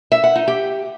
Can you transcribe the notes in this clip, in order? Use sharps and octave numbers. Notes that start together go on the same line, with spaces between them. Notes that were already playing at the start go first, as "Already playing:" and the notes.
E5
F#5
D#4
G4